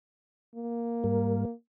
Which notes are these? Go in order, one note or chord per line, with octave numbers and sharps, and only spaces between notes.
A#3
G#2 G3 A#4